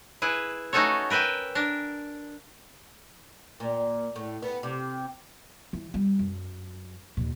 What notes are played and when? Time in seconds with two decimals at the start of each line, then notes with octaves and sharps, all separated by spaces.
0.22 E4 G#4 B4
0.73 A3 C#4 D#4 F#4 A4 C#5
1.10 A#4 B4 E5 G5 G#5
1.55 D4 A#4
3.60 A#2
4.16 A2
4.42 B3
4.63 C3
5.73 E3
5.94 G3
6.19 F#2
7.17 D#2 A#2